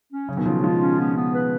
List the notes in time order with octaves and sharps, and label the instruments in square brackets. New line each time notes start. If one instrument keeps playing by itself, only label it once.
[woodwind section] C#4
[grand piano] C#3 [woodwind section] F#3
[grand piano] B2 D#3
[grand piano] C#3 F3 [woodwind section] F4
[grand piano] F3 G#3 [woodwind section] F4
[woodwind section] C#4
B3
B3
B4